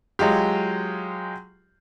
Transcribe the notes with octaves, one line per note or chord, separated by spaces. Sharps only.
F#3 G#3 F4 G4